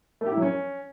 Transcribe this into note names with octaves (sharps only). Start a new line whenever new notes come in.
A3
G4
E4
F#3
C#4